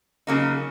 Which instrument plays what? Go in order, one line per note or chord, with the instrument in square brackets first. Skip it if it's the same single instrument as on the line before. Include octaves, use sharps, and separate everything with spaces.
[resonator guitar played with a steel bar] C#3 F#3 A#3 D#4